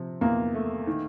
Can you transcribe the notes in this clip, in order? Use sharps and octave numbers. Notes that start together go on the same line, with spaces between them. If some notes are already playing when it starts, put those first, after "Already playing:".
Already playing: C3 F3
E2 A#3
A3
D#3